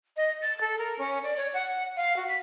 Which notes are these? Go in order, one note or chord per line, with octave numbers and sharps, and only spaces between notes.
D#5
A6
A4
A#4
C#4
D5
C#5
F#5
F5
F#4
B6